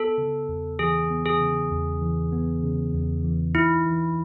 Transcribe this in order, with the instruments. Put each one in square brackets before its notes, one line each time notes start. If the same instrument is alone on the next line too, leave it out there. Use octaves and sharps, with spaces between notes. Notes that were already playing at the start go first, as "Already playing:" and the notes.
Already playing: [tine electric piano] B3 [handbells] A4
[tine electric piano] C#3
E2
[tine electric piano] E3 [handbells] G#4
[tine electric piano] B3
[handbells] G#4
[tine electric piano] C#3
E2
E3
B3
C#3
E2
E3
[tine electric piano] D#4 [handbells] E4
[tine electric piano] E3